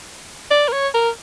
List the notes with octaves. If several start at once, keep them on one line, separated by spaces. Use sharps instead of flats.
D5
A#4
C#5
A#4